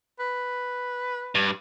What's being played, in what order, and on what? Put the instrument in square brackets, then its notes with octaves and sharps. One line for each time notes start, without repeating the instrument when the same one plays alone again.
[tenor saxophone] B4
[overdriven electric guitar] G2